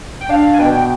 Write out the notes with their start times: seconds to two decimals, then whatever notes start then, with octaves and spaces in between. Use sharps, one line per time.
0.21 G5
0.29 D4 F5
0.54 G#5
0.59 B2 G5